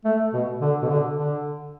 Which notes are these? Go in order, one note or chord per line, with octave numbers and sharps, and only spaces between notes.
A3
B2
D3
B2
D3
D3